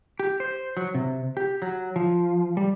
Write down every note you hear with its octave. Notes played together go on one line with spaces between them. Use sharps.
G4
C5
F#3
C3
G4
F#3
F3
G3